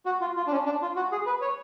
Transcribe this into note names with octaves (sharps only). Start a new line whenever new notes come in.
F#4
F4
F4
D4
C#4
D4
F4
F#4
G#4
B4
C#5